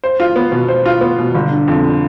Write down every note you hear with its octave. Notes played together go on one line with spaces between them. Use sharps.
C5
F4
B3
B2
C5
F4
B3
B2
G1
D3
F2